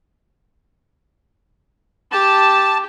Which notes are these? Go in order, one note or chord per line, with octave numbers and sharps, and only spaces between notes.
G4 A5